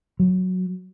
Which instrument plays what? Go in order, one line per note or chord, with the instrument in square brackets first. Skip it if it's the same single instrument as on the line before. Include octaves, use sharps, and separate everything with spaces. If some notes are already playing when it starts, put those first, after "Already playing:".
[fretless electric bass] F#3